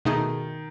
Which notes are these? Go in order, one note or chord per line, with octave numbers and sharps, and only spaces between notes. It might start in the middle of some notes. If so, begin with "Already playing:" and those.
B2 D#3 A3 D#4 G#4